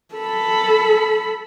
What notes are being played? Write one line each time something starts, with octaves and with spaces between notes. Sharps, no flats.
A4 B5